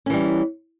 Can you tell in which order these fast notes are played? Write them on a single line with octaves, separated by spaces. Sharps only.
C#4 E3 G3